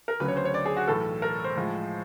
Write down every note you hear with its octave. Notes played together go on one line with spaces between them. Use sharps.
A#4
D2 C#3 F#3 B4
C#5
C5
C#5
D5
G#4
F#4
B1 A2 E3 A3 A4
A#4
C5
A2 F3 G#3